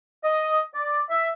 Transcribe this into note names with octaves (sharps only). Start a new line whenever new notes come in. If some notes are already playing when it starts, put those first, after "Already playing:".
D#5
D5
E5